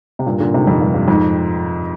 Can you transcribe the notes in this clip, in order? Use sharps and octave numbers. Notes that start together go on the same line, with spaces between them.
C3
G2 A#2
A#2 D3
G#2 C3
F2 G#2
G2
G2
F2 G#2